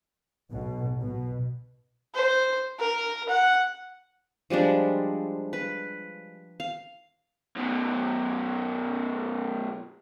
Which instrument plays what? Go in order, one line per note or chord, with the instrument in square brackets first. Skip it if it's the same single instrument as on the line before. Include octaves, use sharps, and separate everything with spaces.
[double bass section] B1 B2
B2
[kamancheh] C5
A#4
F#5
[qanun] F3 G3 G#3 D4
B4
F5
[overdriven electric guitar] F#2 B2